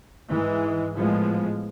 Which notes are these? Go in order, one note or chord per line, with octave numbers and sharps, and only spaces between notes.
G#2 E3 G#3
A2 F3 G#3 B3